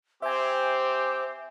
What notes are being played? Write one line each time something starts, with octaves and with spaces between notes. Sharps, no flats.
C4 G4 C5 E5 G#5